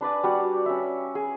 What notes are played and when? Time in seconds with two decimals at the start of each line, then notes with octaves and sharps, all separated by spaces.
0.01 D4 B4 D5 G#5
0.23 G3 F#4 D5
0.66 C#4 E5
1.15 G#4